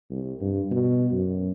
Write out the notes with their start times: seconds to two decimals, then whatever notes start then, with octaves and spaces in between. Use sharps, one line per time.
0.11 C2
0.41 G2
0.71 B2
1.11 F#2